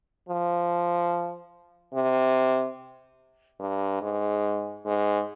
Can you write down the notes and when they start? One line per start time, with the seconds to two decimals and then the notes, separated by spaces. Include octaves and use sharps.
0.29 F3
1.94 C3
3.60 G2
4.02 G#2
4.85 G#2